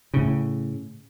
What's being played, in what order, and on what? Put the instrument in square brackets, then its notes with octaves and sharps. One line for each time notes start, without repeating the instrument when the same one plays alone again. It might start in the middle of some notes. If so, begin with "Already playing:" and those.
[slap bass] A2 C#3